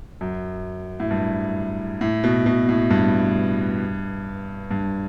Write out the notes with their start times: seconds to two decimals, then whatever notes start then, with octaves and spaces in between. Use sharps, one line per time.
0.21 F#2
1.00 A2
1.11 G2
2.01 A2
2.24 B2
2.46 B2
2.69 A2
2.90 G2
4.71 G2